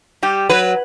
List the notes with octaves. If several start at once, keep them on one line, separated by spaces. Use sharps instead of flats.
G3 G4
F#3 B4